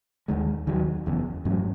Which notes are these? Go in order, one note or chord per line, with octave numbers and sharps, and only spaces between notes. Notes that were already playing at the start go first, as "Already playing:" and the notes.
D#2 D#3 G#3
D#2 D#3 F#3
F#1 E2 C#3
A1 G#2 F#3 C#4